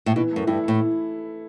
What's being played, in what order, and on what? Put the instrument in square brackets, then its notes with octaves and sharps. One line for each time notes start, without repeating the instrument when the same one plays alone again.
[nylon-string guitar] A2
[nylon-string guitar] B2 [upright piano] E3
[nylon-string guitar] F#2 [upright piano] A3
[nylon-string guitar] G2 [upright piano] E4
[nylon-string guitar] A2 [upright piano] A4